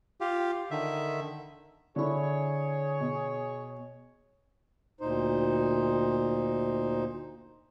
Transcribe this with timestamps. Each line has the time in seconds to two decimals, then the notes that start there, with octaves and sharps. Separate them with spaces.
0.21 F4 G4
0.71 D3 D#3 E5
1.96 D3 E4 G#4 C#5
3.00 B2
5.01 D2 A#2 D#4 C5